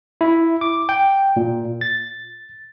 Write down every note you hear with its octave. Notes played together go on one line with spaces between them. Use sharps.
E4
D6
G5
A#2
A6